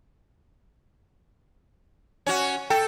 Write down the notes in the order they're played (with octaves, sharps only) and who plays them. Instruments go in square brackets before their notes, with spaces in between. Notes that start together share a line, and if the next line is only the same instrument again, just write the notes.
[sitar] C#4 F#4
[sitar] A4 [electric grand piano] G5